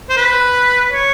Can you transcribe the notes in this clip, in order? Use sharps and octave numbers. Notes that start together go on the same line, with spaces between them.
C5
B4
C#5